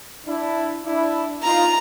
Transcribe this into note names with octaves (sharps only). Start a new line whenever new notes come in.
D4 E4
D4 E4
D#4 F4 A#5